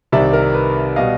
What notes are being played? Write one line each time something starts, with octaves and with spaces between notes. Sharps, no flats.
C2 C3 D#3 D5 E5
A#4
B4
B2 G3 D#5 F5